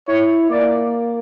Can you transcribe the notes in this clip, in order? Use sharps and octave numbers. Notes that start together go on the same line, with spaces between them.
E4 C#5
A#3 D5